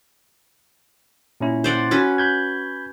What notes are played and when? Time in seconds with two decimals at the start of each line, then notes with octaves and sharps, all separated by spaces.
1.41 A#2 C#4 E4
1.64 C5 D5 F#5
1.91 C#4 F#4 B4
2.18 B5 G6 G#6